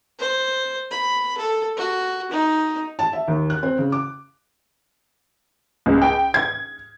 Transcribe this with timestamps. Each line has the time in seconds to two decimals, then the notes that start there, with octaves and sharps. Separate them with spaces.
0.19 C5
0.91 B5
1.38 A4
1.77 F#4
2.31 D#4
2.99 A5
3.13 E5
3.28 D#2
3.50 F#6
3.63 C4
3.78 C#3
3.92 D6
5.86 C#2
6.02 G5
6.34 G#6